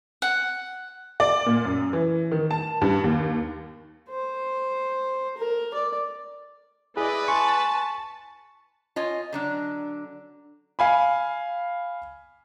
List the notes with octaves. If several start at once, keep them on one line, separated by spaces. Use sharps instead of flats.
F#5
D5
A#2
F#2
E3
D#3
A5
G2
D#2
C5
A#4
D5
E4 G#4 B4 D5 D#5
G#5 A5 C6 C#6
F4 C#5 D#5 G#5
D3 F#3 D4
F5 G#5 B5